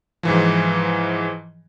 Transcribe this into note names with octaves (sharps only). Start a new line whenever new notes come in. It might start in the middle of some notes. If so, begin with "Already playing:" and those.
G#2 E3 F3